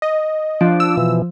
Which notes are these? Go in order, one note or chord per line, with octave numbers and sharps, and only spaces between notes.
D#5
F3 D4
E6
B2 E3